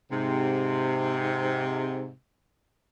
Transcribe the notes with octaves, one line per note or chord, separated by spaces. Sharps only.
G#2 C3